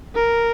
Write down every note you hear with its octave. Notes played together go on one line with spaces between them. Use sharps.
A#4